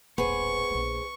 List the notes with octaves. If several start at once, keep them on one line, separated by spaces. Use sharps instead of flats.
D#1 A1 B3 G#4 C5 C#6
A#1 A#3